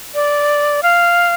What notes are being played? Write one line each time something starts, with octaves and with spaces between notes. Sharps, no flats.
D5
F5